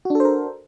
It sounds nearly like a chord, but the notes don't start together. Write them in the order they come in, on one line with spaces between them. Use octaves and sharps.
F#4 D4 A4 C5 A#4